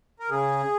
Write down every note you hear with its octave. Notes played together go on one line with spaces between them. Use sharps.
A#4
C#3 G#4